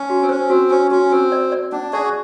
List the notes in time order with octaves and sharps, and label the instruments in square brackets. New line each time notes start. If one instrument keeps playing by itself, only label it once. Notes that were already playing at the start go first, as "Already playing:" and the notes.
Already playing: [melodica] C#4
[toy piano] F#4
[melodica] C4
[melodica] C#4 [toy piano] C5
[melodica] C4 [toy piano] F#4
[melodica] C#4 [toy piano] F#4
[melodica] C#4 [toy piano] F#4
[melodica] C4 [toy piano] F#4
[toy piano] D5
D5
[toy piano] C#4 [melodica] D4
[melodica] F#4 G#4 [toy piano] D5